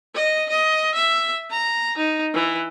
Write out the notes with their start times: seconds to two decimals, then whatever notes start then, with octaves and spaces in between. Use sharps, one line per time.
0.15 D#5
0.49 D#5
0.94 E5
1.51 A#5
1.97 D#4
2.34 E3